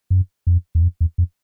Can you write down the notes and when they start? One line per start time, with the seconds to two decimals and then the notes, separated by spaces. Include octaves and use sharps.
0.10 F#2
0.47 F2
0.75 E2
0.82 F2
1.01 E2
1.18 F2